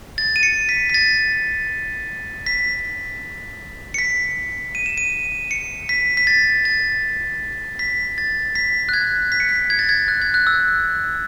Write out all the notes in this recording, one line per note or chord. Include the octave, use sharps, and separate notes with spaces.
A6
D#7
C#7
B6
B6
A6
B6
C#7
B6
D#7
E7
D#7
C#7
B6
B6
A6
A6
B6
A6
B6
F#6
G#6
B6
C#7
B6
G#6
A6
G#6
F#6
G#6
F#6
E6